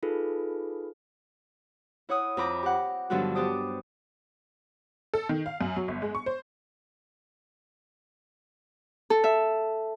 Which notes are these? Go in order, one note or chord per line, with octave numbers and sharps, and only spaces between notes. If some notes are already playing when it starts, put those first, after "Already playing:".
D#4 F4 G#4 A4 B4
E4 C#5 F#5 D#6
F2 C4 A#5 B5 D6
G4 F#5
G2 D3 F3 F#3 B3 F#4
B3 G4 C5 D5 D#6
A4
D#3
F5
F#2
F#3
G1
G#3
C#6
C5
A4
E5